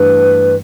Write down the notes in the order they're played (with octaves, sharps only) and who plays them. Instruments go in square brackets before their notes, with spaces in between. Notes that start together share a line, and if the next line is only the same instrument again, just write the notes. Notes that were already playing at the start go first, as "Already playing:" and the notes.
Already playing: [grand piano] G2 E3 A3 D4 G4 [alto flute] B4